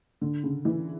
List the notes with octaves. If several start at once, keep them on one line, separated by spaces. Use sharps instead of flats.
D3
C#3
E3